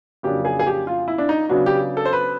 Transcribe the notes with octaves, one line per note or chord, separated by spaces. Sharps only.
F2 C#3 F#3 A#3 D4 G4
G#4
G#4
G4
F4
E4
D4
D#4
C#3 F#3 B3 D4 F#4
G4
A4
C5
B4